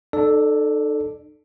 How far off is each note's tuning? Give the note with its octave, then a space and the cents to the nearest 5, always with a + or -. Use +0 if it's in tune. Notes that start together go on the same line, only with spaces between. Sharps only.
D#4 -40 A4 +0 D5 +0